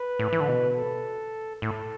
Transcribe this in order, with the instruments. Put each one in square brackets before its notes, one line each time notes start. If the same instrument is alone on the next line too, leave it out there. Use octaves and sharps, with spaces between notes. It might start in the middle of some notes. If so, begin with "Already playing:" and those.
Already playing: [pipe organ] B4
[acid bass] A2
E3
D3
B2
[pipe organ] A4
[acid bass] A2 [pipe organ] A4